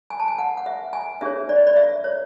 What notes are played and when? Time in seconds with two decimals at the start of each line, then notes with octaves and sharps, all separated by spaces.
0.10 G#5
0.20 A5
0.28 G#5
0.38 F#5
0.57 F#5
0.66 E5
0.93 G#5
1.21 D4 G#4 C#5 E5
1.49 D5
1.67 D5
1.77 E5
2.04 C#5